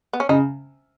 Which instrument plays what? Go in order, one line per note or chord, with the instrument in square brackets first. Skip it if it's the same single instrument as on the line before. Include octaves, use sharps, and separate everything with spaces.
[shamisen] B3
C#4
[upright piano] C#3 [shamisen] D#4